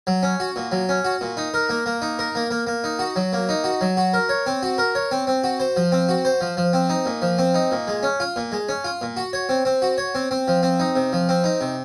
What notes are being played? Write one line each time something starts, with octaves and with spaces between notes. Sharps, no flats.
F#3
C#4
F#4
A#2
F#3
C#4
F#4
A#2
D#4
A#4
A#3
A#3
D#4
A#4
A#3
A#3
A#3
D#4
F#4
F#3
A#3
D#4
F#4
F#3
F#4
A#4
C#5
C4
F#4
A#4
C#5
C4
C4
F#4
C5
F3
C4
F#4
C5
F3
F3
C4
D#4
A#2
F3
C4
D#4
A#2
G#3
C#4
F4
A#2
G#3
C#4
F4
A#2
F#4
C#5
C4
C4
F#4
C#5
C4
C4
F3
C4
D#4
C3
F3
C4
D#4
C3